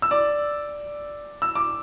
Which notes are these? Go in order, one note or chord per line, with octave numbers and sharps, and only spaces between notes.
E6
D5 D6
E6
D6